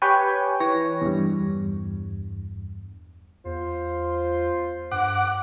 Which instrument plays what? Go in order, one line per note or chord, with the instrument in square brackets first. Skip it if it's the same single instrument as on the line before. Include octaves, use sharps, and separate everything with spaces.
[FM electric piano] G4 B4 C#5 G5 G#5
E3 C#5 A#6
E2 G2
[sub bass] E2 [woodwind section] F4 C5
[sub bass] G2 [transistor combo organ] F#5 D6